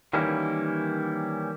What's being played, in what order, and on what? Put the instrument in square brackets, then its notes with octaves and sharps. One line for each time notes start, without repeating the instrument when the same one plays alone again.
[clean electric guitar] D#3 E3 G3 A#3 C#4 E4